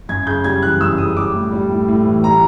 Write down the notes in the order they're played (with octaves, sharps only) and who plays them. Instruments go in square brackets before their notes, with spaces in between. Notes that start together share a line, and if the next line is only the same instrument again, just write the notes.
[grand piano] F#2 G#6
C#3 G6
G3 G#6
E3 F#6
F#2 E6
C#3 D#6
G3 D6
A2
G3
A2
A2
E3
G3 A#5